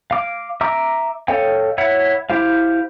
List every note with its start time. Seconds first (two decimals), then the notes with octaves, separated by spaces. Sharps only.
0.11 F5 D6
0.61 E5 A#5 D6
1.28 A4 C#5 D#5 F5 G5
1.78 E4 C#5 E5 F#5
2.30 E4 G4 C5 F5